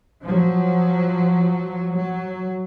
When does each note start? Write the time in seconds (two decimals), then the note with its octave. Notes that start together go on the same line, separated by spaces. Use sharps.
0.24 F3 F#3
1.96 F#3